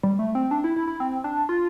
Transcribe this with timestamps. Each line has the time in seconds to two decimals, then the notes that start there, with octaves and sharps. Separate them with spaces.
0.03 G3
0.19 A3
0.35 C4
0.51 D4
0.64 E4
0.76 E4
0.88 E4
1.00 C4
1.24 D4
1.49 F4